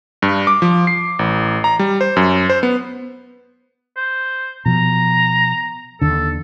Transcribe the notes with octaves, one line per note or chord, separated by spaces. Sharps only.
G2
D6
F3
C7
A1
A#5
G3
C5
F#2
C5
B3
C5
B2 F3 A#5
D#2 D3 A4